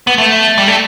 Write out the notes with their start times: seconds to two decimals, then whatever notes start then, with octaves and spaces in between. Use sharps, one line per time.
0.07 B3
0.18 A3
0.58 G3
0.68 A3